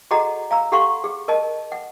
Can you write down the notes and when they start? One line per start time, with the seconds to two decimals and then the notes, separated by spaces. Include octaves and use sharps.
0.11 F#4 G#4 A4 D#5 F#5 A#5
0.51 F5 A#5 E6
0.72 G4 A4 F5 F#5 C6 C#6
1.04 G#4
1.28 A#4 D#5 A5
1.72 F#5